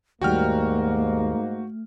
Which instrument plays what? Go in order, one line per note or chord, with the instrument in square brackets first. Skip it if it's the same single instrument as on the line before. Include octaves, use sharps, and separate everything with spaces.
[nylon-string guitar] D#2 G3 [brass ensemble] G#2 A#3 [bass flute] A3 [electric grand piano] F#4 G5 F6